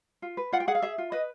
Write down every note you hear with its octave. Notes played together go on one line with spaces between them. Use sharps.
F4
B4
F4 F#5
G5
G#4 F#5
F5
G#4 E5
F4
B4 D#5